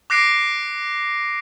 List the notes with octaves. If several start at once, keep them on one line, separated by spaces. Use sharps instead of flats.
D6 F#6 A#6 C7 D7